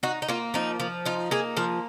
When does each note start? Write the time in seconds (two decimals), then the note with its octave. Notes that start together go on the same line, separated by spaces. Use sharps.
0.03 D#4 F#4
0.22 D#4
0.28 A#3 F4
0.54 F3 D#4
0.80 F3
1.05 D#4 F4
1.31 A#3 G#4
1.57 F3 A#4